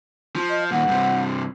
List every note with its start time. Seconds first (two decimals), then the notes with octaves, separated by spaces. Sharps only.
0.36 F3
0.50 D#5
0.71 D#2 A#2 F#5
0.88 G2 C3